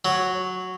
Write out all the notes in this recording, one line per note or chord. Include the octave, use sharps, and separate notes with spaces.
F#3